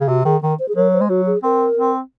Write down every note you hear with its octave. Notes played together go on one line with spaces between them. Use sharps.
C#3
C3 F#4
D#3 G#4
D#3 A#4
C5
G#4
F#3 A#4
C5
G#3
F#3 F#4
G#4
C4 A#4
C4